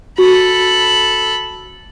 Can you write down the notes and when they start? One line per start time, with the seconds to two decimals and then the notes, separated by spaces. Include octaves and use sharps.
0.18 F#4 A4 B5